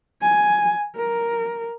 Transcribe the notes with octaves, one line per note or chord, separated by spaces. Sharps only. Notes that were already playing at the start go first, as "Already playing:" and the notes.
G#5
A#4